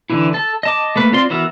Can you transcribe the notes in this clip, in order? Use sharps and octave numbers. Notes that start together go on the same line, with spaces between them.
D3 E3 E4
A4 A5
D#5 A5 D6
A3 A#3 B4
C4 F4 D5 C6
E3 B3 F#4 A#4 E5